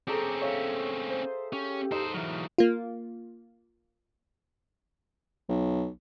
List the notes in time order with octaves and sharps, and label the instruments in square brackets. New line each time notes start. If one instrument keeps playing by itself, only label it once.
[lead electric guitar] C4 C#4 [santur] G#4 A4 A#5 [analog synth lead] D6
[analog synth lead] C#5 [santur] E5 F5
[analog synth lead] C5
[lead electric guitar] C#4 [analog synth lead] G4
[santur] D#4 [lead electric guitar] A4 C5
[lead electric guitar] E3 F#3 [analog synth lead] F6
[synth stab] A#3 F4
[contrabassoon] B1